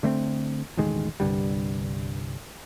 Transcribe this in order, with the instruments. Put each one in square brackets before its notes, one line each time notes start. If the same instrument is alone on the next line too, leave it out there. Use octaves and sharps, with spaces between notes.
[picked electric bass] D3 A3 B3 C4
E1 A1 D#3 G#3
C2 G2 D3 G3